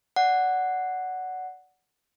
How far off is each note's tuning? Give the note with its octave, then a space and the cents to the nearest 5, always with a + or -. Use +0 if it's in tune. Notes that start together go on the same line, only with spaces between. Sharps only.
D5 -20 F#5 +0